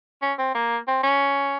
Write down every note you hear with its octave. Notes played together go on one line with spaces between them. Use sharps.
C#4
C4
A#3
C4
C#4